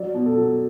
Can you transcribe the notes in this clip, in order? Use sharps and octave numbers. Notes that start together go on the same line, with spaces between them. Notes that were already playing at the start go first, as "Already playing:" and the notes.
Already playing: F#3 D5
B2
A4
F#3